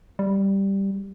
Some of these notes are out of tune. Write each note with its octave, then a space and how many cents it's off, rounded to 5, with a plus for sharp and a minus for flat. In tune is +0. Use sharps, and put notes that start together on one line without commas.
G3 +0